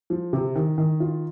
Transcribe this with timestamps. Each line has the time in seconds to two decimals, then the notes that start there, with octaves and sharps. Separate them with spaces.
0.10 F3
0.33 C3
0.55 D#3
0.78 D#3
1.00 F4